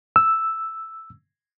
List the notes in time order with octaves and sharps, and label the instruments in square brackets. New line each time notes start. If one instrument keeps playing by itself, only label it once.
[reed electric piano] E6